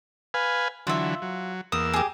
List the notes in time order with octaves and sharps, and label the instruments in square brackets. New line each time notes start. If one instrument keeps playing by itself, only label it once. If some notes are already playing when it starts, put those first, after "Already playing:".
[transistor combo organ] B4 F5 G#5
[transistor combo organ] D3 E3 F#3 [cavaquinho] F4 E5
[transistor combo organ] F#3
[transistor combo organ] E2 A#3 E6 [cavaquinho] D#6
[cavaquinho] G4 G#4